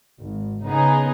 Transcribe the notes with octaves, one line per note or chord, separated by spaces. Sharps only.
G#1
C#3 B3 D#4 G#4